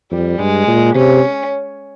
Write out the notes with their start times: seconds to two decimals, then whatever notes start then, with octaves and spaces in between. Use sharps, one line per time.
0.11 F2 G3
0.39 G2 G#3
0.67 A#2
0.95 C3 C#4